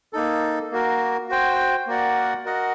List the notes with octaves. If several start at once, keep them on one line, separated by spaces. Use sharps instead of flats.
A#3 D#4 A4
A#3 F#4 A#4
F#4 C5 G5
A#3 F#4 A#4 D5 F#5
F#4 A#4 D#5 F#5